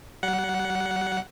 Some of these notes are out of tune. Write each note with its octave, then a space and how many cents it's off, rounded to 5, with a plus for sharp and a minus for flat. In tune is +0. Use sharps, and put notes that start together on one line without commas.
G3 -45 F#5 +0